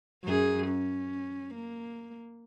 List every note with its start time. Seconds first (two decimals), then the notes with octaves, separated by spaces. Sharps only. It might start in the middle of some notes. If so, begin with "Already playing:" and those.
0.24 F#2 G#4
0.68 C#4
1.54 A#3